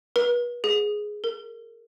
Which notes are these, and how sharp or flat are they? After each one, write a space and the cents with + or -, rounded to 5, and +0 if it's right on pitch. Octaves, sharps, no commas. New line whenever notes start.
B4 -35
G#4 +5
A#4 -15